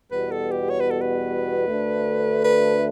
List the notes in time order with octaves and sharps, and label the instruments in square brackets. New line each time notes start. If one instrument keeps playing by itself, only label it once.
[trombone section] E2 B2 G3 B3 F#4 [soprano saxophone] B4
[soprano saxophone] A4
G4
C#5
B4
A4
B4
[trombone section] D2 D3 A3
[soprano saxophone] B4